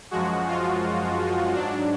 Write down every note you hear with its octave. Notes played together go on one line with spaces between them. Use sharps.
F#2 F3 G#3 F#4
F4
G#2 F#3 D4